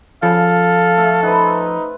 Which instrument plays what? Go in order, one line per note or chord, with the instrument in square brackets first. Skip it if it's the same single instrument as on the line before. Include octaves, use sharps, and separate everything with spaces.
[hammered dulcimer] C#3 [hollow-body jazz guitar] F3 [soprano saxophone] A4 [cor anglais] F5
[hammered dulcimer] A3 E5
[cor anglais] D#4 [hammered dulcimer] B4 C5 F#5